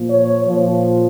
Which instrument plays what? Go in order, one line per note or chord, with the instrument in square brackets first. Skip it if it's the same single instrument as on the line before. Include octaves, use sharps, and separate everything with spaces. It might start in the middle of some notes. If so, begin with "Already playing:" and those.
Already playing: [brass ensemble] A#2 F3
C#5
A#2 F3